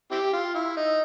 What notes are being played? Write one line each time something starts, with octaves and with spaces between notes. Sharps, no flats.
C4 E4 G4
F4
E4
D#4